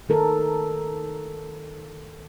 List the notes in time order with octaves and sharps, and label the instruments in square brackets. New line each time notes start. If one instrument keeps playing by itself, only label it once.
[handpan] D#3 A4 A#4